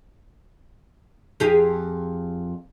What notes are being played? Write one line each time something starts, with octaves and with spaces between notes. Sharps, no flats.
F2 G4 G#4